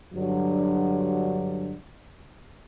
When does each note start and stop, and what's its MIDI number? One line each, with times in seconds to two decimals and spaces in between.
0.14 1.75 43
0.14 1.75 50
0.14 1.75 54